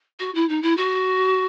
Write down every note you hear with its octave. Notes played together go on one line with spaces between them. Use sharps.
F#4
E4
D#4
E4
F#4